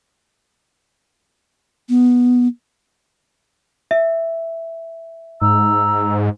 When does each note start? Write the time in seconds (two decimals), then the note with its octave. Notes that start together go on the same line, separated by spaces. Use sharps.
1.89 B3
3.91 E5
5.42 G#2 A#5 E6